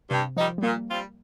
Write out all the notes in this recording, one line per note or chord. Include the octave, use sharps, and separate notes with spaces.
G2 C3
D#3 F3 G3 D#4
G3
A#2 A#3
G3 C4 F4